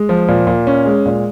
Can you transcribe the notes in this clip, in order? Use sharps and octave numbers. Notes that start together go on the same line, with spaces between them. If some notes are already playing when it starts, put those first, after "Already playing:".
Already playing: G#3
F3
A#2
A#2
C#4
G#3
A#2